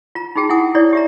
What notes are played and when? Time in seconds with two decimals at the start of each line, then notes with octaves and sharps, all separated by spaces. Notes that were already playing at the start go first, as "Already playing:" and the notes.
0.15 F4 A#5
0.36 D#4 F#4 G#4 G5 A5
0.49 E4 F#5 G#5 D#6
0.75 E4 C#5 D5
0.93 G4 E5 A#5